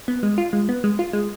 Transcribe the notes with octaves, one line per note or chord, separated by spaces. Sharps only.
B3
G#3
F4
G#3
B3
G#3
F4
G#3